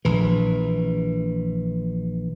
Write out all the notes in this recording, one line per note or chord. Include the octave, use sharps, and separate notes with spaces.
A#1 E3